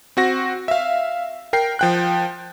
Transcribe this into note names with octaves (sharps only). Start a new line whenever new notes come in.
C4 F#4 A#6
E5 F5
A#4 G5 C7
F3 G5 F#6